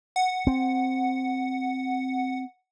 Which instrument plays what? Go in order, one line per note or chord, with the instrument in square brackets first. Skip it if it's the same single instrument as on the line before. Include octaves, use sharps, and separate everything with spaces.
[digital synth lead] F#5
[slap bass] C4